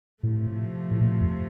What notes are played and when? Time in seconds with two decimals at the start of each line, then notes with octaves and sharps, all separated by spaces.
0.22 A2 C3 F3 A3
0.91 A2
1.01 A#2
1.21 F2